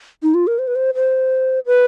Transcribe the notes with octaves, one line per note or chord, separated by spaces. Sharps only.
D#4
F4
A#4
C5
B4
C5
C5
B4